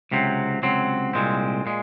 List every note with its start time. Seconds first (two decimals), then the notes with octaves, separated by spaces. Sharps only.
0.11 C#2 C3 F#3 C4
0.62 C#2 C3 F#3 C4
1.13 C2 A#2 G#3 C4
1.66 A#2 G#3